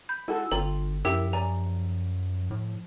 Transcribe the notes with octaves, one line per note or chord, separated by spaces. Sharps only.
B5 G6
G#3 E4 F#4 A4 E6
G1 D3 F4 A4 G5 A#5
F#2 F3 E4 G4 A#4 E5 G5 E6
D5 G#5 A#5
A2